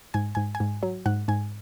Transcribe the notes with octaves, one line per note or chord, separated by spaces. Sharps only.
G#2 G#5
G#2 G#5
G#5
G#2
F#3
G#2 F#5
G#2 G#5